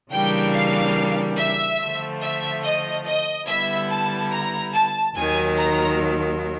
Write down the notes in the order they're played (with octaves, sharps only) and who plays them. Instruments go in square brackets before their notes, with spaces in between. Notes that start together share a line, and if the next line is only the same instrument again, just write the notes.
[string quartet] C#3 E3 G3 A#3 D4 [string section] G5
[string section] F5
E5
[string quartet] D3 F3 A3
[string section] E5
D#5
D#5
[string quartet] D3 G3 B3 E4 [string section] E5
[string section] A5
A#5
A5
[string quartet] D#2 D#3 F#3 [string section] G#5
[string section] A#5